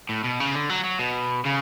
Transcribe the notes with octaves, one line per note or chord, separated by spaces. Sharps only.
A2
B2
C#3
D3
F#3
F#3
B2
C#3